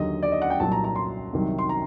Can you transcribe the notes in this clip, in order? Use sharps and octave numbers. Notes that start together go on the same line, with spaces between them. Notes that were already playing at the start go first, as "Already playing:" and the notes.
Already playing: D#2 D3 F#3 D#5
D5
D#5
F#5
G5
C2 A#2 F#3 A5
A#5
A#5
C6
C2 C3 D#3 F#3
C6
A#5